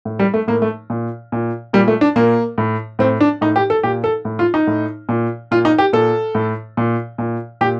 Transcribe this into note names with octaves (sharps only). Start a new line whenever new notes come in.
A2
G3
A3
A2 A#3
A3
A#2
A#2
A#2 G3
A3
D4
A#2 A#3
A2
A2 C4
D4
A2 D#4
G4
A4
A#2 G4
A4
A2
F4
D#4
A2
A#2
A#2 F4
D#4
G4
A#2 A4
A2
A#2
A#2
A#2 G4